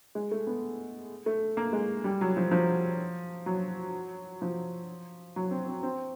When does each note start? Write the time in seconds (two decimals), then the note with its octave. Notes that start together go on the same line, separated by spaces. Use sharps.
0.15 G#3
0.31 A3
0.47 B3
1.26 A3
1.57 A#3
1.73 G#3
2.04 G3
2.21 F#3
2.37 F3
2.52 F3
3.46 F#3
4.42 F3
5.36 F#3
5.51 C4
5.67 C4
5.83 C4